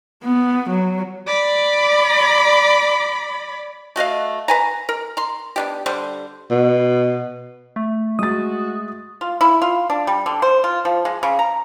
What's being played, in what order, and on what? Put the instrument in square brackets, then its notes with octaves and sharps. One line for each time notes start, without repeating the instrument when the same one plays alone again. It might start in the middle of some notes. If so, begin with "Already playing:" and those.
[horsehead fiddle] B3
F#3
[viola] D5 B5
[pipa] A3 F#4 D#5 F5
B4 G#5 A#5
A#4
A#5 C6
B3 D4 G4
D3 G3 C5
[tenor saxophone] B2
[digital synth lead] A3
[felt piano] G#3 A6 [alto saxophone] F#4 [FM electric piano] D#6
[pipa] F4
E4
F4
D4
G3
D3
C5
F4
F3
G#3
C#3
A#5